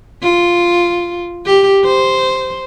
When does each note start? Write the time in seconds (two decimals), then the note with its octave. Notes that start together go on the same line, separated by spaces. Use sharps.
0.22 F4
1.46 G4
1.84 C5